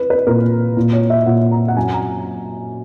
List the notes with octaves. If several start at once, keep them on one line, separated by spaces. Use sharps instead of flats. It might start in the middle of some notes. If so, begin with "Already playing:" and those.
Already playing: B4
B4
A#2 A#4
A#2
C#5
E5
A#2 F#5
A#5
F#5
F#2 G#5
A#5